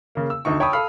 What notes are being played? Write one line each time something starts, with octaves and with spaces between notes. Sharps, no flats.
C#3 A#3
E6
D2 D#4 C#6
C#5 G5 A5 B5 C#6 D#6
A4 F5 B5 F6